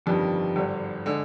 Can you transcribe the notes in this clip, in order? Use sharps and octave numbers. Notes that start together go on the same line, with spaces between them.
G1 F2 D#3 G3 D4
G#1 G2 D3
D3 G#3